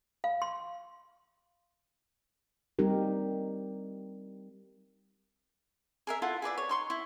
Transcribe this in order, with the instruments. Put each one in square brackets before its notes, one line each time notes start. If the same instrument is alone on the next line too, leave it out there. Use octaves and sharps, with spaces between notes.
[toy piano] F5
C6
[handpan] G3 C4 D#4 G4 A#4
[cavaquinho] G#4 A#4 E5
E4 F4 A4 F#5
G#4 B4 D5 E5
C#5
D#4 C6 C#6
E4